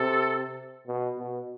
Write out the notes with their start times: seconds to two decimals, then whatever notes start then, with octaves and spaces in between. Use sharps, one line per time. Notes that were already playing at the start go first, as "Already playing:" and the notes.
Already playing: C3 A4
0.87 B2
1.18 B2